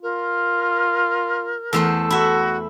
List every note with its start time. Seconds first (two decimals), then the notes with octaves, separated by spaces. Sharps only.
0.02 F4 A#4
1.73 E2 A3 A4 C5
2.10 E4 F#4 E5